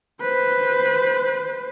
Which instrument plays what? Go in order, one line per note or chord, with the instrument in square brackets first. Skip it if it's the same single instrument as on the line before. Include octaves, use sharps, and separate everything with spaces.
[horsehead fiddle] B4 C5